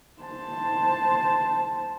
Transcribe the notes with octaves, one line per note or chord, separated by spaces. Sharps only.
C5 A5